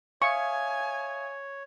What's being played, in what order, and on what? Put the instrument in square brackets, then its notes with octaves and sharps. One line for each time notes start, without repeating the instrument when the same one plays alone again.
[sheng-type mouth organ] C#5 [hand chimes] E5 F5 D#6 [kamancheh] G#5 [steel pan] C#6